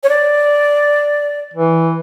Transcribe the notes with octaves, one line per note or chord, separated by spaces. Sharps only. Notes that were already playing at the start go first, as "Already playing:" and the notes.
C#5
D5
E3